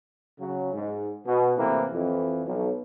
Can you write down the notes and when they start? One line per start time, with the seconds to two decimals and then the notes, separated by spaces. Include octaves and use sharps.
0.39 C#3 F#3
0.73 G#2
1.26 B2
1.57 A2 C3 E3 A#3
1.92 F2 E3
2.45 B1